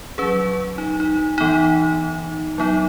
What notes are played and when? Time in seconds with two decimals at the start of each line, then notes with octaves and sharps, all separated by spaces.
0.18 F#3 C#4 G#4 B4
0.78 D#4
1.00 D#4
1.38 E3 B3 D#4
2.58 F#3 B3 D#4